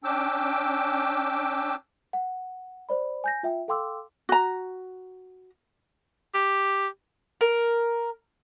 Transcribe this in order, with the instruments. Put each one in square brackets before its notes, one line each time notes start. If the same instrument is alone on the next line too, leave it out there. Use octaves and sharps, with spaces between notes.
[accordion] C#4 D4 G5 D6 E6
[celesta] F#5
C5 D5 B5
G#5 G6 A#6
F4 E5 G5
A4 F5 G5 C6 D6 E6
[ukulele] F#4 A#5
[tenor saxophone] G4
[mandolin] A#4